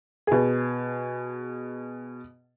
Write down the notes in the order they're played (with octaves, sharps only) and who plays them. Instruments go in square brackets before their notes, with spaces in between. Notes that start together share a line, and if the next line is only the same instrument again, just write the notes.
[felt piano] B2 G#4